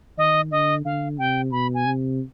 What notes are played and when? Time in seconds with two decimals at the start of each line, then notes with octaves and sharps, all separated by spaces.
0.18 D#3 D#5
0.51 D3 D#5
0.85 D3 F5
1.18 C3 G5
1.52 B2 B5
1.74 G#5
1.85 C3